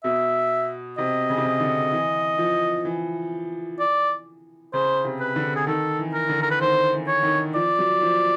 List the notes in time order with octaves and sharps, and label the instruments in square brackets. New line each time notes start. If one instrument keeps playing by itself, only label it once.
[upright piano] B2 [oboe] E5
[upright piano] C3 [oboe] D#5
[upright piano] C#3
C3
C#3
D3
E3
F3
E3
[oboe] D5
[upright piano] C#3 [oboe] C5
[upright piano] C3
[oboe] B4
[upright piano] D3
[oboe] G#4
[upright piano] D#3 [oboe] A4
[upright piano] E3
[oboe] A#4
[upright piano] D3
[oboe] A#4
B4
[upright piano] D#3 [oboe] C5
[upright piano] E3
[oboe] C#5
[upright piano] D#3
[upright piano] F3 [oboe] D5
[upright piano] F#3
F3